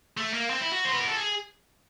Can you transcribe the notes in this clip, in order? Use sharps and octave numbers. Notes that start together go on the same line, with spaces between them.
A3
A#3
C4
E4
F#4
C5
B4
A#4
A4
G#4